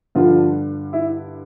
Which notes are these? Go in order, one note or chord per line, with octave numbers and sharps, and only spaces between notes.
G2 D3 F3 F4
E4